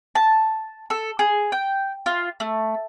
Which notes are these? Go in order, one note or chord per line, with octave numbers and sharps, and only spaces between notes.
A5
A4
G#4
G5
F4
A3